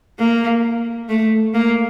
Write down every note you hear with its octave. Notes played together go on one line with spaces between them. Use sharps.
A#3
A3
A#3